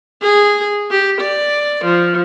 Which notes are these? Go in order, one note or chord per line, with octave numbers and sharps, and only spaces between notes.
G#4
G4
D5
F3